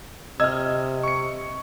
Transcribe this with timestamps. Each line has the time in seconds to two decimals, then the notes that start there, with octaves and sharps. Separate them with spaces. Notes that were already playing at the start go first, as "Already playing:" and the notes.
0.40 C3 D#5 E6 F6 G#6
1.03 C#6 C#7